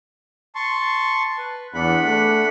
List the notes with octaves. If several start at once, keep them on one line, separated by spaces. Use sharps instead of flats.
A5 C6 C#6
B4
E2 D4 F#5 B5
A3